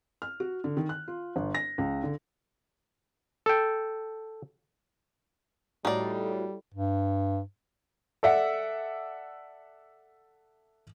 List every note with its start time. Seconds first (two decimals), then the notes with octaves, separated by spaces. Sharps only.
0.22 F6
0.40 F#4
0.64 D3
0.77 D#3
0.89 F#6
1.08 F4
1.36 G1
1.55 A#6
1.78 C#2
2.03 D3
3.46 A4 G5
5.85 A2 G3 D#4 F#4 A4 C#5 D5
6.74 G2
8.23 A4 D5 E5 F#5